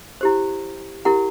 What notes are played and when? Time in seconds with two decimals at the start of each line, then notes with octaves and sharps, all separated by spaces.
0.21 E4 G4 C5
1.05 E4 G4 A#4 F#5